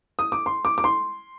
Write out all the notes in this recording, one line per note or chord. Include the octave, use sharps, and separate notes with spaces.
D#6
D6
C6
D6
D6
C6